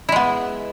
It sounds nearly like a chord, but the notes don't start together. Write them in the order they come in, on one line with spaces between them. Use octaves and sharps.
E4 G#3 B3